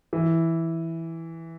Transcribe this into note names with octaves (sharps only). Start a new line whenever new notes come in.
E3